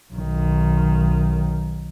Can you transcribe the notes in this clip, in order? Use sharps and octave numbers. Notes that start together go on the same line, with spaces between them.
B1 D#3